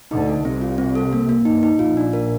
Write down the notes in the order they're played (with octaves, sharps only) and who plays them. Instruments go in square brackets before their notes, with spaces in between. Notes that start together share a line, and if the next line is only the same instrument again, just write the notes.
[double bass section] D2 D3 [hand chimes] D#4
[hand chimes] A4
[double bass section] C2 C3 [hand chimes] C4
[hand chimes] F4
C4
A4
A#3
A#3
[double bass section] G2 [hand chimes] D#4
[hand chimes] D#4
[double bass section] A#1 A#2 [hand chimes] F4
[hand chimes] D4
A#4